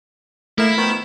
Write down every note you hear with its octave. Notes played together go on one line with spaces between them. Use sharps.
A3 A#3 E4 A#4 E5
D#3 F3 B3